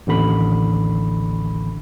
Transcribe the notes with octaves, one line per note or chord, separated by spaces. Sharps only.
A1 D#2 D3 B5